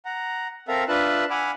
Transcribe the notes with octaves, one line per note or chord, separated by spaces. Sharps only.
F#5 A#5
C4 A4 A#4 E5 F5 A#5
D4 F4 B4 E5 A5 F#6
F#5 G#5 B5 D6 E6 F6